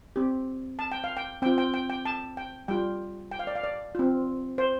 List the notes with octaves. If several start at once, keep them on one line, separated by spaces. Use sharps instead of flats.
C4 G4
A5
G5
F5
G5
C4 F4 G5
G5
G5
G5
A5
G5
G3 F4 G5
G5
F5
D5
F5
D5
C4 F4
C5